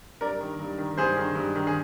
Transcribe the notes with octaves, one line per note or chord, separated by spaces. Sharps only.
G2 A#4 D5
D#3
G2
D#3
G2 G#4 C5
D#3
G2
D#3
G#4